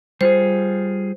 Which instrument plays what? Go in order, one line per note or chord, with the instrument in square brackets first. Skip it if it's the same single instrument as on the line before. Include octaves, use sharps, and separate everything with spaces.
[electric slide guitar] G3 F4 G#4 [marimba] C5